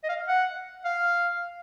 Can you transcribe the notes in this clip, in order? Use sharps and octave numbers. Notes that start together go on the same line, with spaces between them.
D#5
F5
F#5
F5